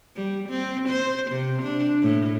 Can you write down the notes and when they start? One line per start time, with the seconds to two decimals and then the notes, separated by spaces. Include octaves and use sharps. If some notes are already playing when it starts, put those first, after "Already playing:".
0.16 G3
0.49 C4
0.89 C5
1.31 C3
1.62 D4
2.02 A2